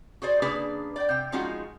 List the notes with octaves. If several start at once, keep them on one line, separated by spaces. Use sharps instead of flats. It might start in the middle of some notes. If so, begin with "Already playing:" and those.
F#4 G#4 C5 D5
C#3 A#3 D4 G#4 B4
D5 G5
C3 G5
F3 G#3 C#4 D#4 F4 F#4